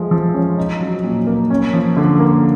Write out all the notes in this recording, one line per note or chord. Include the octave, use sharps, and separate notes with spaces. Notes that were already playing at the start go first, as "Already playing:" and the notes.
Already playing: F3 G#3 A3
F3
C#4
D#4
F#3
A#2
A#3
C#4
F3
D3
A#3